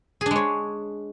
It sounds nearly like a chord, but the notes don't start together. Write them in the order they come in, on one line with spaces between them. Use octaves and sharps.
G#4 D4 G#3 C#5